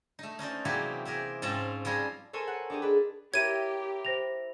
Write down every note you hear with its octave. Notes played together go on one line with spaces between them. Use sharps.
A3 D#4
C#4 D#4 C5 D5
C3 E3 F#3 A#3 G4 G#4
C4 G4 G#4 A#4
G#2 C4 C#4 F4 A5 A#5
F3 G3 G#4 A#5
A4 A#4 C5 C#5 G#5
F#5
D4 D#4 G4 G#4
D4 B4
E4 G4 A#4 C#5 E5 G#6 D#7
C5 A#6 F7